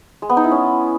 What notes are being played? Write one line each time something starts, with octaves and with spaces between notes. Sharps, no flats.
G#3
B3
D#4
E4
C#4